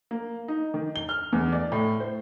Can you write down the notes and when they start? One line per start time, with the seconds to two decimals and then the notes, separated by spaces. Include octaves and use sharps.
0.11 A#3
0.48 D#4
0.74 D#3
0.96 G7
1.09 F6
1.33 E2
1.53 D5
1.72 A2
2.00 C5